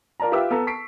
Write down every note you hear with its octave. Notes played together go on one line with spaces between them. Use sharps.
F4 A#4 D5 A5 A#5
F4 G4 B4 E5 D6 E6
B3 A4 A#5
A5 C#6 B6 C7 D7